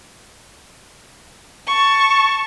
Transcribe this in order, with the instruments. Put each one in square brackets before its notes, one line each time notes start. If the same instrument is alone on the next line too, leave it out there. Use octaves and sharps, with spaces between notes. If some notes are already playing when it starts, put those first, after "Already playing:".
[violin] A5 C#6